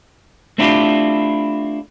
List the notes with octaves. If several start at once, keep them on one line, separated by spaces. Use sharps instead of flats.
A3 C4 D4 E4 F4 G4